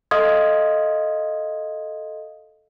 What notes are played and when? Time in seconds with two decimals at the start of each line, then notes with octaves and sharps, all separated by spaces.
0.11 A4 D#5 F5 C6 D#6 G#6